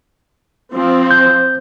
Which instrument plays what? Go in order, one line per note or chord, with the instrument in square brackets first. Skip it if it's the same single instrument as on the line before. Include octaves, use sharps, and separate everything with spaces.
[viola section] F3 C4
[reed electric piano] G6